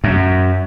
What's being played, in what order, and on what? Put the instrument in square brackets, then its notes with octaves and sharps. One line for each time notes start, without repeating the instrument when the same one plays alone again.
[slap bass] F#2